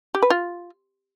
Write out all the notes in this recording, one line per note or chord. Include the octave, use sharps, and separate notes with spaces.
G4
B4
F4